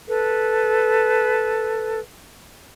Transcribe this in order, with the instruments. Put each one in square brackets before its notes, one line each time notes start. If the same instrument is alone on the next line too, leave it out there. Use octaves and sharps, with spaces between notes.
[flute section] A4 B4